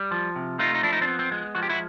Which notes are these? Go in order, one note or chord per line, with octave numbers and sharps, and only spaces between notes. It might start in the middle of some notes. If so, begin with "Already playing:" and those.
Already playing: G3
F3
C3
A3 D#4 F4
D#4
F3 D4 E4
D#4
C4 D4
B3
C4
G#3
F3 F#4
G4
E4 F#4